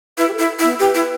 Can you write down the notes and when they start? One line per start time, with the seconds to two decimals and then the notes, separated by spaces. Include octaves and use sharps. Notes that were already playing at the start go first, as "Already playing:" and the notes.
0.18 E4 B4
0.28 G4
0.33 A4
0.39 E4
0.59 E4
0.63 B3
0.79 G4 B4
0.94 E4